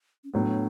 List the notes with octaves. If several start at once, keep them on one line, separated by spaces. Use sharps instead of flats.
C#4
A2 F#3 B3 D4